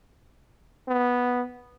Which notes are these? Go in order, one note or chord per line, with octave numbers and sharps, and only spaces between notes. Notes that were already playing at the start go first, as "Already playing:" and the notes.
B3